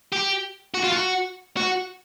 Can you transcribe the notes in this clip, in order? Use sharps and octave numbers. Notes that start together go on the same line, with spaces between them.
G4
F#4
F4
F#4
F#4